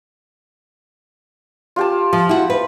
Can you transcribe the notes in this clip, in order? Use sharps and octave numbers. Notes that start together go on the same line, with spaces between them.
F4 G4 A5
F3
E4 F#4
B4